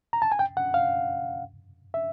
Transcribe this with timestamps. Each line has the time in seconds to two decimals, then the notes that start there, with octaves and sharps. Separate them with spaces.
0.13 A#5
0.22 A5
0.32 G#5
0.39 G5
0.57 F#5
0.74 F5
1.94 E5